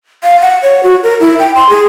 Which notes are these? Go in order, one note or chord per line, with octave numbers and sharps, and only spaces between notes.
F5
F#5
C#5
F#4
A#4
E4
G5
C6
G#4